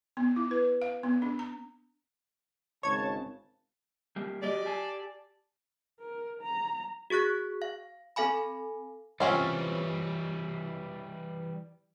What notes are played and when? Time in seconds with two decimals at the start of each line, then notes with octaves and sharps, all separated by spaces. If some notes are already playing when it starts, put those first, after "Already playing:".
0.17 B3
0.36 E4
0.51 B4
0.82 F5
1.03 B3
1.22 D4
1.39 A#5
2.83 G#1 C#3 C#5 A5 G#6
4.16 G3 A#3 G4
4.42 F#3 G4 D5 D#5
4.65 G4 G#5 A5
6.00 A#4
6.42 A#5
7.10 F#4 G#4 C#6 F#6 B6
7.62 F5
8.16 C4 A4 F5 G#5 B5
9.20 E3 G3 C4 C#4 F4